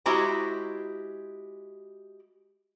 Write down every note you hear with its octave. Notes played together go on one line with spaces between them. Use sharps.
G#3 E4 F#4 G4 C5 A#5